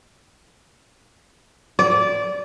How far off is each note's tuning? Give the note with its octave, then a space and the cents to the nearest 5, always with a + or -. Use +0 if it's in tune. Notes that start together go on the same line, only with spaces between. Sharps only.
D5 -20